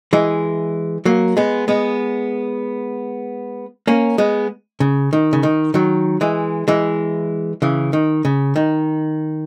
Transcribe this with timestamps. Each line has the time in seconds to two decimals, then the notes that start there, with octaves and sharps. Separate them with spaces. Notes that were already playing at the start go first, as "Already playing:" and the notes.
0.13 E3 G#3
1.05 F#3 A#3
1.37 G#3 B3
1.68 G#3 B3
3.88 A#3 C#4
4.18 G#3 B3
4.80 C#3
5.13 D#3
5.33 C#3
5.43 D#3
5.74 D#3 F#3
6.21 E3 G#3
6.68 E3 G#3
7.62 C#3 E3
7.93 D#3
8.25 C#3
8.56 D#3